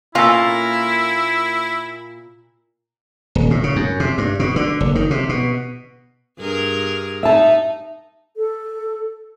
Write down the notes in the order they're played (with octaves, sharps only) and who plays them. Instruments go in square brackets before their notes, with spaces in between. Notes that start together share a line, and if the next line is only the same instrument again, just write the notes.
[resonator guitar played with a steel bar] A#2 A#3 F4 [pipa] C#4 A4 [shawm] E4
[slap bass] D#1
A2
C#3
F#2
C3
G2
B2
D3
F#1
D#3
C3
B2
[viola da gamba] G2 G#4 A#4
[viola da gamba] D#4 [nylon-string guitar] E5 A5
[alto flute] A4